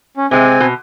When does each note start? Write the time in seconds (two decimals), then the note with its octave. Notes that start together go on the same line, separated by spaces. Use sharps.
0.17 C#4
0.31 C3 G#3 C4 G#5
0.60 B2